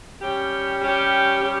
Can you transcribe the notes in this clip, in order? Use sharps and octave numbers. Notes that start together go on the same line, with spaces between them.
G3 C#4 G4
G3 C#4 G4
G3 C#4 G4